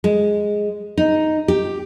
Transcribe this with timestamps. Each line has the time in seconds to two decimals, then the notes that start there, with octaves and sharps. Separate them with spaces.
0.04 G#3
0.97 D#4
1.48 G4